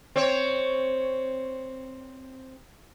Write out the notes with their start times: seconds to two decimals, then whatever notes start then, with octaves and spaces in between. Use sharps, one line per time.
0.16 C4 C#5